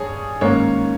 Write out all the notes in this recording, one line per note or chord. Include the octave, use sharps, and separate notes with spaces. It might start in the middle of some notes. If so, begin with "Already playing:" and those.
Already playing: G2 G#4 C#5
G#2 D#3 A#3 C#4 C#5